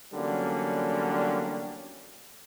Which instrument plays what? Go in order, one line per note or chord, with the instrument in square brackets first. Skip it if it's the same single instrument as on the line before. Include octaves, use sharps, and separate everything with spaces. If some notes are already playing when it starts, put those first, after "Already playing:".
[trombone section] E2 D3 F#3 G3 A#3 C#4